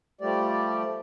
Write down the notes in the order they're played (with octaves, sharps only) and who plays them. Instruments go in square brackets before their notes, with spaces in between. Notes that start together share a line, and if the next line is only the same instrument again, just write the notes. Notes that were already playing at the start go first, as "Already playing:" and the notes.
[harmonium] F3 G3 A3 G4 D5